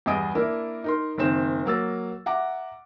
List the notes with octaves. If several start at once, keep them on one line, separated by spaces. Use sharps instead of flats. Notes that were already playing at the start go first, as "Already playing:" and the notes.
E2 G2 G#4 D#5 D#6 D7
A#3 D4 E4 A#4
D#4 A#4 C6
F#1 D#3 C4 E7
F#3 A#3 E6 A6
E5 F#5 A#5 D6